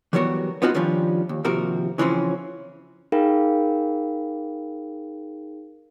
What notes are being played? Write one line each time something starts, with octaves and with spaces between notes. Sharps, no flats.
E3 F#3 G3 B3 F#4 A#4
B3 C4 D#4 F4 F#4
D#3 F3 G3 C#4 D4 F4
D#2
D#2 C3 F3 F#4 A#4
C#3 E3 F3 C4 C#4
D#4 G#4 A#4 F5 G5 B5